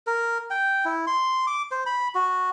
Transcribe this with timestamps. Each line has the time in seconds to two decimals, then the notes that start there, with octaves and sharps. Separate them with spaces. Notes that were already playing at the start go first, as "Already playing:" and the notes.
0.07 A#4
0.50 G5
0.85 E4
1.07 C6
1.47 D6
1.71 C5
1.86 B5
2.15 F#4